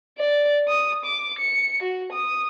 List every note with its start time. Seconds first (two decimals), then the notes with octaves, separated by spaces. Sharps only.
0.18 D5
0.68 D#6
1.05 D6
1.39 C#7
1.83 F#4
2.12 D#6